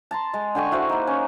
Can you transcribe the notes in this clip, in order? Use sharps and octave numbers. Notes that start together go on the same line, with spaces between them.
A5 A#5 C6
G#3
D3 G5 G#5 C#6
E4 F#4 C5 F5
A#3 D#4
C#4